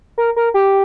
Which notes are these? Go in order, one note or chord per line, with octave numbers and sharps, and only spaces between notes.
A#4
A#4
G4